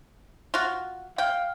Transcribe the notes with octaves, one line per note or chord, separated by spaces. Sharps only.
F4 F#4
F5 G5